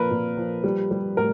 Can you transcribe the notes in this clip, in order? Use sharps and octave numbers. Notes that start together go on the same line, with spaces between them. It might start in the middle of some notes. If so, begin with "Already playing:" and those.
Already playing: A#2 F3 A#4 B4
A#2
F3
G3
G3
A2 A#4